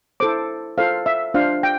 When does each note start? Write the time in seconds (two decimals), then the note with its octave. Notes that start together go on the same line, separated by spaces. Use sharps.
0.20 E4 A4 C5 D6
0.78 F4 A4 C5 F5
1.06 E5
1.34 D4 F4 C5 F5
1.63 G5